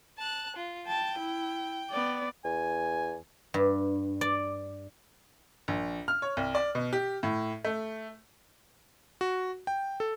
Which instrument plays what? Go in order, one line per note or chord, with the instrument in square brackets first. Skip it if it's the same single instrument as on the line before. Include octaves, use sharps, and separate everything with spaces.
[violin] A5 F#6
F4
[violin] G5 [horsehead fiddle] A5
[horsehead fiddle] E4
B3 D5
[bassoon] E2 [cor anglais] G#5
[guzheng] G2
D5
[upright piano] A#1
F6
C#5
C2
D5
B2
G4
A2
A3
[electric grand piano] F#4
G5
A4